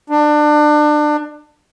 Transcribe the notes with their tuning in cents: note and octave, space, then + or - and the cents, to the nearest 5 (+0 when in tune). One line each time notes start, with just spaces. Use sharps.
D4 +25